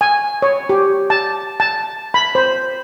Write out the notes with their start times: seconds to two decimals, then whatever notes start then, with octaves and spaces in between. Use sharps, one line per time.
0.01 G#5
0.42 C#5
0.69 G4
1.10 A5
1.60 A5
2.14 B5
2.35 C5